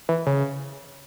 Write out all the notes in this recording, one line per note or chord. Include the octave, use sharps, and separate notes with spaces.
E3
C#3